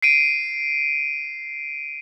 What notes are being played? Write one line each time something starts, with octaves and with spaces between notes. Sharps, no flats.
C7 D7 D#7